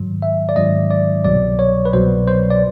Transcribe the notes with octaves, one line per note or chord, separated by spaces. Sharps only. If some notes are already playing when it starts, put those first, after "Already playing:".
Already playing: G#2 D#3 F#3
E5
D5
G#2 D#3 F#3 D#5
D5
C2 B2 F#3 D5
C#5
B4
C2 B2 F#3 C5
C5
D5